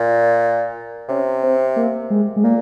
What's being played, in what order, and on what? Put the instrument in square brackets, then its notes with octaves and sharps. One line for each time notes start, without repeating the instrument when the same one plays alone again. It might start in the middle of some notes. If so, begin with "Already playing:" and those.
Already playing: [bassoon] A#2
[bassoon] C3 [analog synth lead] C#4
[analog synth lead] C4
A#3
G#3
G#3
[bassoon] A#2 [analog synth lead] A#3